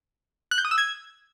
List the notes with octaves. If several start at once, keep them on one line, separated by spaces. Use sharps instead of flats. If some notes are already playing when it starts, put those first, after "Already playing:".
F#6
G6
D#6
E6
G#6